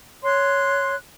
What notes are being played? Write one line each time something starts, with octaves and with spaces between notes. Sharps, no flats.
C#5 C6 F#6